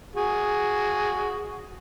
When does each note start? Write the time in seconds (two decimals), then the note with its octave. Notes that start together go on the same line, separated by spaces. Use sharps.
0.16 F#4 G#4